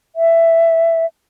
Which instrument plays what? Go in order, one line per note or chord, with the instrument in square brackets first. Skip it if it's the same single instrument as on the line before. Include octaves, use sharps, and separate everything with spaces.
[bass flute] E5